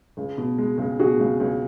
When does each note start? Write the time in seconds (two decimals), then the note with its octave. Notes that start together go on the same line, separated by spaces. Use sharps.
0.17 C#2
0.38 B2
0.58 G#3
0.78 C#2
0.99 B2 F#4 G#4
1.20 C#2
1.40 C#2